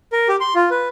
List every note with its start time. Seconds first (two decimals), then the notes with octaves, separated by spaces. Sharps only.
0.12 A#4
0.28 G4
0.40 C6
0.55 F4
0.71 B4